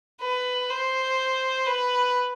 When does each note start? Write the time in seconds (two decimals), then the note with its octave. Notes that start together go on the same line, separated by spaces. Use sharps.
0.22 B4
0.70 C5
1.67 B4